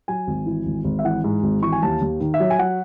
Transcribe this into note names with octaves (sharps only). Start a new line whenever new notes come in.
F#3 G#5
G#1
E3
G#1
G#1
E5
E3 F#5
G#2
G#1
E3 C#6
G#5
D#2 A5
D#2
D#3
E5
F#3
G#5
F#3 F#5